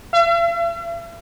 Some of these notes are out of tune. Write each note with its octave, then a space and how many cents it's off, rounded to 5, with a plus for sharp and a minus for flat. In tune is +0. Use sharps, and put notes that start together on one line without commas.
E5 +45